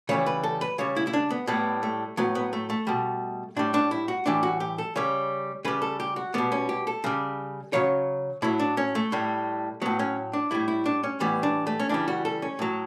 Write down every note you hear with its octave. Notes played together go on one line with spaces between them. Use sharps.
C#3 E3 G3 C#5
B4
A4
B4
C#3 G3 C#5
E4
E4
D4
B3
A2 G3 B3
A3
A2 F#3 B3
B3
A3
A3
B2 G3
A2 G3 D4
D4
E4
F#4
A2 E3 G3 D4
F#4
G4
A4
C#3 G3 C#5
C#3 G3 B4
A4
G4
F#4
B2 G3 B3
C#4
G4
A4
C#3 G3
C#3 F#3 C#5
A2 F#3 E4
D4
C#4
A3
A2 G3
A2 F#3 B3
C#4
D4
A2 G3 E4
E4
D4
C#4
A2 E3 G3 B3
D4
A3
C#4
C#3 E3 G3 D4
F#4
A4
C#4
A2 F#3